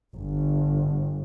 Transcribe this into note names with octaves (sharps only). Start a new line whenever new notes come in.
G1